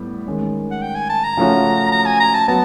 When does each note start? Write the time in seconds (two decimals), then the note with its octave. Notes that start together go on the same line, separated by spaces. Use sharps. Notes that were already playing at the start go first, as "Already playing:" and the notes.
Already playing: A2 G3 B3
0.26 D#3 G#3 C#4
0.71 F#5
0.82 G5
0.95 G#5
1.10 A5
1.24 A#5
1.37 C#3 F3 A3 C#4 F#4
1.92 A#5
2.06 G#5
2.20 A#5
2.34 A5
2.48 F#3 B3 A5